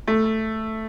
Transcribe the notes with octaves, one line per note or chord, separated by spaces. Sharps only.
A3